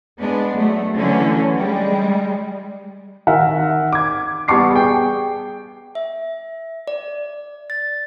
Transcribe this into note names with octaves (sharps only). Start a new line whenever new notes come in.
G#3 B3 D4
F#3 A3
D3 E3 F#3 A3 C#4
G3 G#3
D#3 A#4 E5 F#5
D6 G#6
G3 B3 A5 C#6 D6 C7
G#4 G5
E5
D5
A6